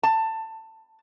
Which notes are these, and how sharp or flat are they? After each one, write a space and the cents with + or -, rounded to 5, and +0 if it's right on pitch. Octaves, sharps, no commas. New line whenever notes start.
A5 +15